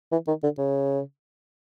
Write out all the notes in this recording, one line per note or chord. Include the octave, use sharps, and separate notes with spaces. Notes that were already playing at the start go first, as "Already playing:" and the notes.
E3
D#3
D3
C#3